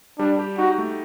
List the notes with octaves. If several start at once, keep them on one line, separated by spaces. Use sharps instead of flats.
G3 D4
G4
D#4 F#4
A3